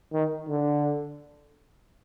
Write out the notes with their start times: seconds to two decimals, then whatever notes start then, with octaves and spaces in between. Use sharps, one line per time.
0.13 D#3
0.49 D3